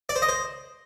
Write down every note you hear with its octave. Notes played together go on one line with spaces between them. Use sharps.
D5
C5
D#5
C5